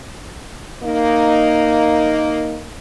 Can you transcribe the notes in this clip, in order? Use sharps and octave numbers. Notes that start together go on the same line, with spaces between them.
A#3 D#4